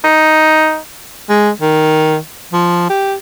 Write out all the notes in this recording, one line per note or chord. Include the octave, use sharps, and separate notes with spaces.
D#4
G#3
D#3
F3
G4